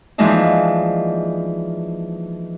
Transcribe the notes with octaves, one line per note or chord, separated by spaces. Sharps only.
E3 F3 G#3 A#3 D4 D#4